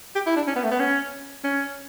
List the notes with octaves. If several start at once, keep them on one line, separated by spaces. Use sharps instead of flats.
G4
E4
D4
C#4
B3
A3
B3
C#4
C#4